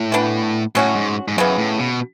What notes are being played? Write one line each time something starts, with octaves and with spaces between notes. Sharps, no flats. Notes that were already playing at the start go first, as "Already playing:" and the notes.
Already playing: A2
E3 B3 D4
A2 F#3 C#4 F#4
G#2
G#2
F#2 C#3 E3 B3
A2
B2